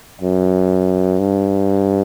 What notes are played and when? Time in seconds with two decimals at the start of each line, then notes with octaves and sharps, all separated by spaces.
0.21 F#2
1.19 G2